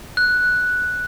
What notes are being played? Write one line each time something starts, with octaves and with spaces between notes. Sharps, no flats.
F#6